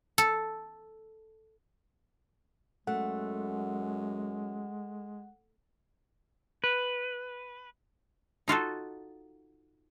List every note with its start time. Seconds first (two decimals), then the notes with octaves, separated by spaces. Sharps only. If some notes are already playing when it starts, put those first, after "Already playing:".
0.18 A4
2.87 F#2 G#3 A3 F#5
6.64 B4
8.48 D#4 F4 F#4 A4